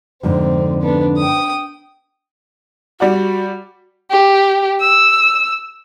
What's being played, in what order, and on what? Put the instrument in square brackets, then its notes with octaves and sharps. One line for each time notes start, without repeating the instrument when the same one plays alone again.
[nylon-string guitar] F2 G#2 D3 [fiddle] C4
[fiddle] B3 D4
G5 D#6
[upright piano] G3 D5 F#5 [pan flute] F#4
[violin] G4
E6